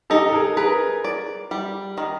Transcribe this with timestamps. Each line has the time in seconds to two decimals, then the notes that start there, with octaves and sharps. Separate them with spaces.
0.10 D#4 G4 A4
0.29 A4
0.33 G#4 A#4
0.57 G#4 A#4 B4
1.04 D5
1.51 G3
1.98 D#3